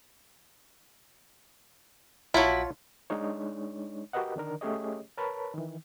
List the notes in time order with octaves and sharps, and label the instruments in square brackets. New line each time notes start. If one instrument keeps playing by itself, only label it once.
[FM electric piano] A#1 A5 [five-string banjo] F#3 E4 [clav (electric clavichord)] F4 C#5
[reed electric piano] G#3 D4 D#4 C#5
F#4 G4 A#4 B4 D#5 F#5
D3 D#3 D4 A#4
A3 C#4 G4 G#4 C#5 D#5
A#4 B4 C#5 A5 B5
D#3 E3